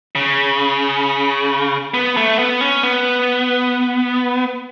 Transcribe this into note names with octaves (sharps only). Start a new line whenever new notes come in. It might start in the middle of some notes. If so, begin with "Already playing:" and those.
C#3
B3
A3
B3
C#4
B3